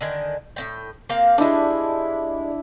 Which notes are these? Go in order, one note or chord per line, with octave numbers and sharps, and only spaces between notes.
D3 D#3 G#5
A2 C4 G5
A#3 C4 F5
G3 G#3 D4 E4